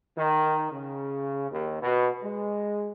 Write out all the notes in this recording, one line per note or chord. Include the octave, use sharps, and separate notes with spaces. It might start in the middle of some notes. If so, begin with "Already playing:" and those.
D#3
C#3
D#2
B2
G#3